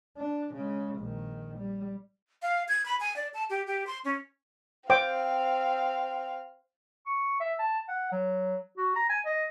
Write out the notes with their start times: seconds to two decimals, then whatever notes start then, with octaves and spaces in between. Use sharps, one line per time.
0.18 D4
0.54 C#3 G#3
0.99 A#1 D#3
1.58 G3
2.42 F5
2.68 G#6
2.86 B5
3.00 G#5
3.16 D5
3.34 A5
3.50 G4
3.67 G4
3.87 C6
4.05 C#4
4.90 C4 C5 F5 G5 D6
7.06 C#6
7.40 E5
7.59 A5
7.89 F#5
8.12 F#3
8.78 F#4
8.96 A#5
9.10 G#5
9.26 D#5